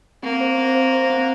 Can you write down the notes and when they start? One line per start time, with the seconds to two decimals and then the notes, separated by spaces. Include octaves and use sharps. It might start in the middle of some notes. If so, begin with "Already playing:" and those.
0.23 A#3 C4
0.40 C5
0.58 C4
0.75 C5
0.93 C5
1.10 C4